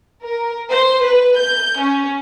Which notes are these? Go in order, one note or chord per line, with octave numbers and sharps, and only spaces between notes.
A#4
C5
B4
G6
C#4